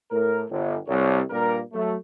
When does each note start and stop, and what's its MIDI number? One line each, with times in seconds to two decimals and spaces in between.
0.10 0.42 45
0.10 0.42 70
0.49 0.75 31
0.87 1.20 36
0.87 1.20 73
1.30 1.58 43
1.30 1.58 46
1.30 1.58 55
1.30 1.58 58
1.30 1.58 70
1.73 1.94 54
1.73 1.94 57